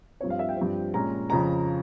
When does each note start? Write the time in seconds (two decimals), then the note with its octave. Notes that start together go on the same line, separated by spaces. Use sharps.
0.21 G2 F3 C4 C#5
0.30 F5
0.39 E5
0.49 G5
0.57 G2 F3 C4
0.94 A#2 G#3 C#4 A#5
1.30 F2 C#3 F3 A#5